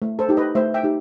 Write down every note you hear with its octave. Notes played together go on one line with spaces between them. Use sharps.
A3
A4 C5
D#4 G4
B4 D#5
A3 C5 E5
E5 G5
D#4 G4